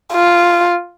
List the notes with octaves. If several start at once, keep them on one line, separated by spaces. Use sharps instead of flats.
F4